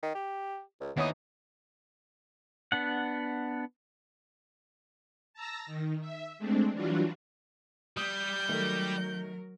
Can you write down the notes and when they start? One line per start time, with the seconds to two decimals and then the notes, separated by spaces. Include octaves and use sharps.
0.03 D#3
0.15 G4
0.80 C#2
0.97 D#2 E3 B3 D#4 C#5 D#6
2.72 B3 D4 F#5
5.34 A5 A#5 E6 A#6
5.66 D#3
6.01 E5
6.39 G#3 A3 C4 D4
6.73 E3 F#3 G3 D4 F4 F#4
7.97 G3 D#6 G6
8.49 D#3 F#3 A3 A#4